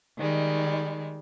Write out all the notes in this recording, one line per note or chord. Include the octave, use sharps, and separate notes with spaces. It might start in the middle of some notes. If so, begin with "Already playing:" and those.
D#3 G3 G#3